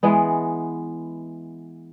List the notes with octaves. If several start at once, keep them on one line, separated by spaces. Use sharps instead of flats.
E3 G#3 B3